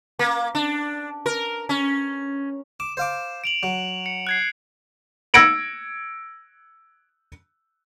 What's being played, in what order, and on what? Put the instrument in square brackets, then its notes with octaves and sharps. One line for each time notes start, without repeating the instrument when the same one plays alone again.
[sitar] A#3
D4
A#4
C#4
[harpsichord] D6 [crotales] E7
[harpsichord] C5 F5 D6
[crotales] D7 F7 F#7
[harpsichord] F#3
[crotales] C#7
F#6 G#6 C7
[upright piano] E6 G#6 A#6 C#7 D7 F#7